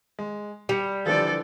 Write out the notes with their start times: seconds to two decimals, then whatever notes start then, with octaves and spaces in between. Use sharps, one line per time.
0.19 G#3
0.69 G3 C#7 F7
1.06 D3 E3 F3 A4 D5